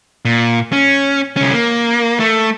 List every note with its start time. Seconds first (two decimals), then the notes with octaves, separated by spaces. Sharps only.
0.25 A#2
0.73 C#4
1.37 C2 C#4
1.54 A#3
2.20 A3